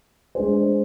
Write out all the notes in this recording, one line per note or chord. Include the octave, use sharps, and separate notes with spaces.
G#3 D4 G#4 C5